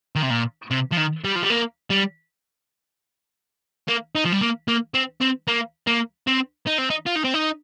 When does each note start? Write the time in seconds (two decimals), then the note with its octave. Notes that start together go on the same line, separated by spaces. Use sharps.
0.16 D#3
0.23 C3
0.30 A#2
0.71 C3
0.92 F3
0.97 D#3
1.24 G3
1.35 F3
1.43 G3
1.50 A#3
1.90 G3
3.88 A#3
4.15 D#4
4.25 F3
4.33 G3
4.41 A#3
4.68 A#3
4.94 C4
5.21 C4
5.47 A#3
5.87 A#3
6.27 C4
6.67 D#4
6.78 C4
6.90 D#4
7.06 F4
7.16 D#4
7.25 C4
7.34 D#4